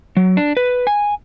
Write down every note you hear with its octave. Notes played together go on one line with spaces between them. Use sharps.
F#3
D4
B4
G#5